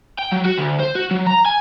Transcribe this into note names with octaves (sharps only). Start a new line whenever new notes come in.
G5
F#3
F#4
D2
C5
F#4
F#3
A#5
G#5